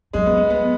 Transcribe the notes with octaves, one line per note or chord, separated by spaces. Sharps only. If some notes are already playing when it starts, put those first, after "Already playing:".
F#3 G#3
B3
B3
B3